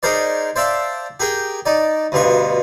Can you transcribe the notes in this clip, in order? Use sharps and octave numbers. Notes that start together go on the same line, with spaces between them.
D#4 G#4 A#4 C5 D5
C5 D5 E5 F5 A5
G4 G#4 A#4 G5
D#4 D5
D2 G2 B2 F4 C#6